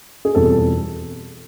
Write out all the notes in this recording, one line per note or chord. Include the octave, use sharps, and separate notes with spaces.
G#4
E2 B2 G3 C4 F4 A4